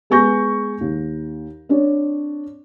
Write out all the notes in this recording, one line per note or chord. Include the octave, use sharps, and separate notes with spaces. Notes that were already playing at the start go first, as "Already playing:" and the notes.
G#3 B3 G#5 C#6 G6 A#6
D#2
C4 D4 C#5